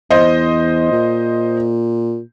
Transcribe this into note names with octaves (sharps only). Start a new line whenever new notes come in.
E2 C5 D#5
A#2